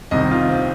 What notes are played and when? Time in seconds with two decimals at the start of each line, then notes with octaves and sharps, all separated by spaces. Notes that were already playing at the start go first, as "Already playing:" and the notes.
0.11 C2 C3 D#3 D#5
0.31 F4
0.49 C4